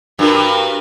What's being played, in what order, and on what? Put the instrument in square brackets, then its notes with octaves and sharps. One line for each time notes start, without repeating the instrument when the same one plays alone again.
[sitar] G2 [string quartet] F#4 A#4 B4